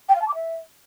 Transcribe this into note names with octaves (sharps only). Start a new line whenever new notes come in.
G5
F5
A5
D6
E5